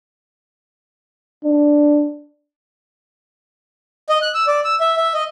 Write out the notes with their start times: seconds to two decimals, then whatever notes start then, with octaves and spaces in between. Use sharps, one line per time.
1.44 D4
4.09 D#5
4.22 F#6
4.34 E6
4.47 D5
4.65 E6
4.80 E5
4.97 E5
5.14 D#5